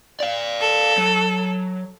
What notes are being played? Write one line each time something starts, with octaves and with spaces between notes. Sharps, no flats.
D5 F5
A4
F#3